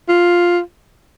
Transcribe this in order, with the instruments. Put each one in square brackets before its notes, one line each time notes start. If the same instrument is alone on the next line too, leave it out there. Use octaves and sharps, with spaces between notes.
[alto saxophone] F4